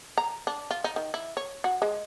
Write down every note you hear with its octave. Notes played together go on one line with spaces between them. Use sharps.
A#5
D4
F4
D#4
D#3
E4
C#5
F#4
G#3